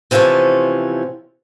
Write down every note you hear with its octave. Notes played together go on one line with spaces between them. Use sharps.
C3 E3 F3 A3 C#4